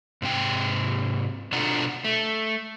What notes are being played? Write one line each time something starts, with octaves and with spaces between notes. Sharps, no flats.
G#2 C3 G5
B2 D4 F4 A4 F#5 A#5
A3